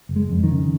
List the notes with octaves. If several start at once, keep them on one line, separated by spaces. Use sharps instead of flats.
F#1
G#3
F2
D#3
C#3